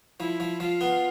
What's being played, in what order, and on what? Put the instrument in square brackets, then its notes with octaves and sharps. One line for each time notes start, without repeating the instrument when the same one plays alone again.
[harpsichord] F3 [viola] E4
[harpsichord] F3
[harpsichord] F3 [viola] F4
[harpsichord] B3